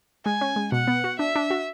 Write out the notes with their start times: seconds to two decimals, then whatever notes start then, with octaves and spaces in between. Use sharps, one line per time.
0.25 G#3 G#5
0.41 C#4
0.56 G#3
0.72 B2 F#5
0.87 B3
1.04 F#4
1.19 D4 E5
1.35 D4
1.50 F#4